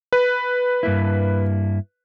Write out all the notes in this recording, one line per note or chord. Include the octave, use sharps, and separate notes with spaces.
B4
G2 A#3 E4